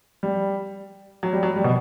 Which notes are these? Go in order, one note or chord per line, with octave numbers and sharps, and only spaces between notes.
G3
F#3
G3
F#3
G3
B2